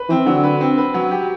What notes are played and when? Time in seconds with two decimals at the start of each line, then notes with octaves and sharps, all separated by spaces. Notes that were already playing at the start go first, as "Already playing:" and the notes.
Already playing: B4
0.09 E3 C4
0.26 D3 F#3
0.44 B4
0.61 C4
0.78 B4
0.94 F#3
1.11 G4